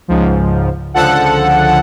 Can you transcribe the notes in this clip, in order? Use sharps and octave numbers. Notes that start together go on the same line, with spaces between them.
C#2 G#2 F3
C#2 D3 F3 A4 F#5